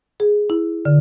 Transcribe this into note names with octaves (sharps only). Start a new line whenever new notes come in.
G#4
E4
D3